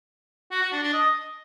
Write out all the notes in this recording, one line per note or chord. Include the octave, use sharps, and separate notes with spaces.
F#4
F#4
D4
D4
D#5